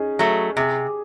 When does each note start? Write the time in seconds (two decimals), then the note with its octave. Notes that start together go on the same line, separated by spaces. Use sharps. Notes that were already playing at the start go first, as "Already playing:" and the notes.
Already playing: C#4 D#4 G#4
0.19 F#3 A3
0.57 C3 G#4